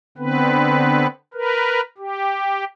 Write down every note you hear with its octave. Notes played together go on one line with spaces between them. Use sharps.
D3 B3 C4 B4
A#4 B4
G4